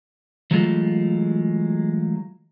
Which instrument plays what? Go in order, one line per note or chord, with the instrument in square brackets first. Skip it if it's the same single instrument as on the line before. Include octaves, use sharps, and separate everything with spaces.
[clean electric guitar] E3 F#3 G#3 A3 F4